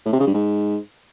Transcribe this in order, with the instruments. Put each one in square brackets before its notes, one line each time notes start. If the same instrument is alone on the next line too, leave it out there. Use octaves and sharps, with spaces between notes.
[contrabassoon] A2
C3
C#3
G2
G#2